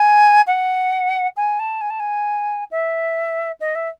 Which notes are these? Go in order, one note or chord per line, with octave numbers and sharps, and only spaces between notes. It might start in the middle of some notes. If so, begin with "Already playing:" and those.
Already playing: G#5
F#5
G#5
A5
G#5
A5
G#5
E5
D#5
E5